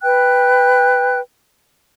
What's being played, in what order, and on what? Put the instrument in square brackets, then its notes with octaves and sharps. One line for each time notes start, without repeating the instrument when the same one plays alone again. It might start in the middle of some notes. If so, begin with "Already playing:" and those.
[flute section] B4 G5 F#6